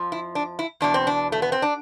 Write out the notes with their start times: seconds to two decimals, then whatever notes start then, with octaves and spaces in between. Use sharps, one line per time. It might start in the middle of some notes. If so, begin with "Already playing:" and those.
Already playing: F2 F3
0.12 E4
0.35 D4
0.59 E4
0.81 E2 B2 D4
0.94 C4
1.07 D4
1.32 A3
1.42 B3
1.52 C4
1.62 D4